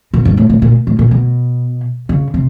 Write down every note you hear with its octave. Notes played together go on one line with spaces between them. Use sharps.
B2
G2
A2
A2
A#2
A2
A#2
B2
C#3
C3